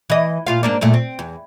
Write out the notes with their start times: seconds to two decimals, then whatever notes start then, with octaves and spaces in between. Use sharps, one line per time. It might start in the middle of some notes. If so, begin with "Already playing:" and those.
0.10 E3 D#5
0.47 A#2 F4 F5
0.63 G#2 A#3 D4
0.81 F#2 A#2 A3
0.94 C4
1.19 E2